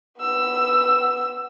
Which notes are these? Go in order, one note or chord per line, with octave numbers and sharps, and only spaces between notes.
B3 E6